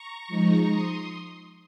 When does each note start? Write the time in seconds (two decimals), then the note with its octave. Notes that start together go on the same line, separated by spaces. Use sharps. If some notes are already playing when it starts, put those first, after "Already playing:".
Already playing: A#5 C#6
0.28 F3 G#3 D#4
0.70 C6 D#6